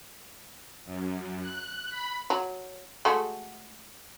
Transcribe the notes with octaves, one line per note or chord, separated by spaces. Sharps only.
F#2
F#6
B5
F#3
G#3 A3 F#4